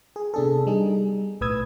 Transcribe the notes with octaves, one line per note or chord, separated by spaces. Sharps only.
G#4
C3 B3 D4 G#4 A4
G3 D#4 G#4
B1 A2 B4 D#6 E6 G#6